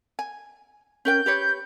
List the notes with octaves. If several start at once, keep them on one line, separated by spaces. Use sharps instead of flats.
G#5
C#4 A#4 G5 G6
G4 B4 C#5